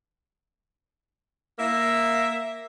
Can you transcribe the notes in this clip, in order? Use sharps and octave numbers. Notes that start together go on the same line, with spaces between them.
A#3 E5